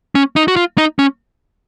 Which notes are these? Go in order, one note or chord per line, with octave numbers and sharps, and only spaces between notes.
C#4
D#4
F#4
F4
D#4
C#4